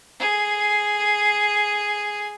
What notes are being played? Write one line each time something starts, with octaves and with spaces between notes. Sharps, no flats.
G#4